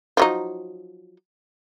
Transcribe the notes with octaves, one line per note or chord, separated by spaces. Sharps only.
F3 F#3 D#4